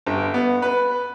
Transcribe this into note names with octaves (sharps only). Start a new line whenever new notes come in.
G1
B3
B4